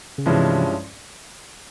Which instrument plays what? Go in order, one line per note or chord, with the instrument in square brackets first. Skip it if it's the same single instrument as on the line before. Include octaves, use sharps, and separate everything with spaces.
[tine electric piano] C#3
[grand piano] G2 F3 G#3 C#4 E4 [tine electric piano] C3 E3